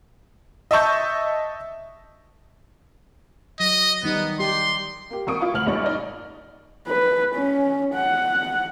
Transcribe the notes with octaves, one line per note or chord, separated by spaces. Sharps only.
D#5 E5 A5 C#6 G6
F#3 D#5
D#3 G3 B3 D#4
G4 C6
A#3 G4
G#1 A#3 C#6 D#6 D7
E4 F4 C#6
D2 C#5 F6 F#7
A#1 G3 D#4 D5 C#6
D#4 D5 D#5
B4
C#4
F#5